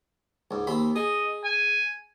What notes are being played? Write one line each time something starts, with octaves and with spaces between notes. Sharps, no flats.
C#2 G#2
D#2 C4 B5
G#4 D#5
G#5